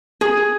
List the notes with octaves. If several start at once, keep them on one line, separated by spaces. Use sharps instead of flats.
G#4